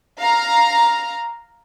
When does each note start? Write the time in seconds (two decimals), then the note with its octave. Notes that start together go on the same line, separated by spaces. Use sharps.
0.20 F5 A#5